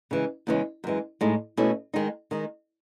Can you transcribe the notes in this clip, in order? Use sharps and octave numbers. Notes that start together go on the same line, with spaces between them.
C#3 E3 G#3
E2 C#3 E3 G#3 C#4
F#2 E3 G#3
A2 G#3 D#4
B2 A3 C#4 E4
D#3 G#3 D#4
D#3 G#3 D#4